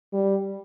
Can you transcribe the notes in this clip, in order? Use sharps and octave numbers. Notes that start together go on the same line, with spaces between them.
G3